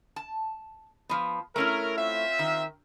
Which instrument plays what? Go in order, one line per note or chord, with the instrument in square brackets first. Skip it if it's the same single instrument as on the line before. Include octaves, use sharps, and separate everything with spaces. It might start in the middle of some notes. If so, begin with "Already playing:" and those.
[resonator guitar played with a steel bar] A5
F3 B3
[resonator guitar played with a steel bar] A3 C#4 E4 [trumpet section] A#4
[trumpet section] C4 F4 E5
[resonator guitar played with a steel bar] D#3